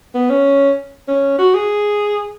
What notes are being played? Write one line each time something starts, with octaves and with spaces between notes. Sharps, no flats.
B3
C#4
C#4
F#4
G#4